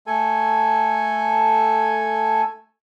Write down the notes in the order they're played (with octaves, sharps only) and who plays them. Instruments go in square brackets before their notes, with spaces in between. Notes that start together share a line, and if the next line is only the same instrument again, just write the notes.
[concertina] A3 A4 G#5